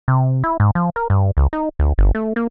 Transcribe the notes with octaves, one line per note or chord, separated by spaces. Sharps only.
C3
E4
G#2
F3
A#4
G2
C#2
D#4
D2
G1
A3
A#3